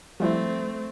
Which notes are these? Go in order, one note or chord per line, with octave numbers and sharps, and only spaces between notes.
F3 G3 A3 C4 E4